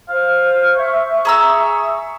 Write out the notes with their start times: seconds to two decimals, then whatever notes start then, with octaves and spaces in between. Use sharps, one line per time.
0.10 C5 F5
0.76 E5 C#6
1.25 G#4 A#5 E6